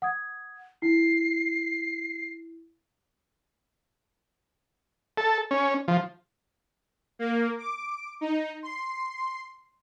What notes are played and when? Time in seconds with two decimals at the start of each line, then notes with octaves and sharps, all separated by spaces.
0.02 F#5 D#6 G#6
0.82 E4 C7
5.17 A4
5.51 C#4
5.88 F3
7.19 A#3
7.58 D6
8.21 D#4
8.63 C6